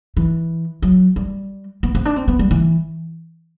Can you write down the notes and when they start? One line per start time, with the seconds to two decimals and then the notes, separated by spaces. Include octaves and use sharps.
0.17 E3
0.82 F#3
1.16 G3
1.83 B3
1.95 C4
2.05 D4
2.16 C4
2.28 B3
2.39 G3
2.51 E3